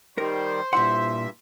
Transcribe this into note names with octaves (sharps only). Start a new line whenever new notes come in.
D#3 G3 A#4 C5
G2 A#2 E4 E5 F#5 C6